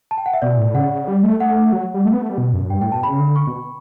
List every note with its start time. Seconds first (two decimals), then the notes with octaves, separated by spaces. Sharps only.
0.11 A5
0.18 G5
0.26 F#5
0.34 E5
0.42 B2 D5
0.58 A2
0.74 C#3 F#5
1.08 G3
1.23 A3
1.40 A3 F#5
1.73 F#3
1.94 G3
2.05 A3
2.13 B3
2.22 A3
2.29 G3
2.38 B2
2.53 F#2
2.70 G2 G5
2.81 A2 G5
2.92 B2 A5
3.03 C#3 B5
3.19 D3
3.36 C#6
3.47 B2